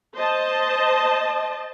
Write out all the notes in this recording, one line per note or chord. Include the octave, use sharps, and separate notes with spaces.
C5 D#5 A5